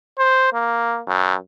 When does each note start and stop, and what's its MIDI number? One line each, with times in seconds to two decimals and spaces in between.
0.19 0.52 72
0.53 1.01 58
1.07 1.35 42